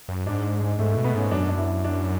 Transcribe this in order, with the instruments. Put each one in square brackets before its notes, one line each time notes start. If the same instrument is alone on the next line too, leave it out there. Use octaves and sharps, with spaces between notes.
[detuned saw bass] F#2
[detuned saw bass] G#2 [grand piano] D4
[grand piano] G#3
[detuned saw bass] G#2 [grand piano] A3
[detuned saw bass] B2 [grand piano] A3
[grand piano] B3
[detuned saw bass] G#2 [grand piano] C#4
[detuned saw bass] F#2 [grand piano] D4
[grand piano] D4
E4
D4